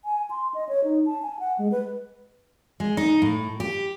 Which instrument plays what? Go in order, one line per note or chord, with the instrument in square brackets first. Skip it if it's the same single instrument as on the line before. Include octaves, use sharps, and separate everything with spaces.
[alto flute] G#5
C6
D#5
C#5
D#4
A5
G#5
F#5
G#3
B4
[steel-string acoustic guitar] G#3
D#4
A2
G4